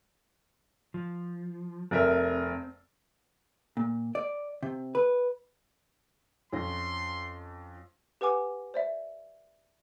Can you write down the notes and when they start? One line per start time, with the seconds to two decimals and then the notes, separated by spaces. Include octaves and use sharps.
0.94 F3
1.91 F1 C4 A#4 E5
3.77 A#2
4.15 D5
4.63 C3
4.95 B4
6.53 F2 C#4 C6 A#6
8.21 G4 B4 F#5 G#5 D6
8.74 C5 D5 E5